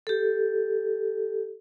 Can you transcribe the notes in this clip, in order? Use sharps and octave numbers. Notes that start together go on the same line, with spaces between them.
G4 A4